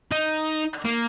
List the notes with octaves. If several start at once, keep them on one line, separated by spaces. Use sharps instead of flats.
D#4
A#3